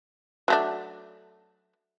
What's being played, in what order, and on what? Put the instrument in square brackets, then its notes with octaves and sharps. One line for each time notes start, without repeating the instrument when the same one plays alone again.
[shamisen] F#3 A3 D4